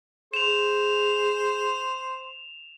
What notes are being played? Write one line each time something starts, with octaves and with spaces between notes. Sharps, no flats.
G#4 C5 E7 F7